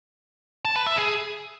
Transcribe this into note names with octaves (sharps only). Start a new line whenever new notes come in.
A5
B4
E5
G#4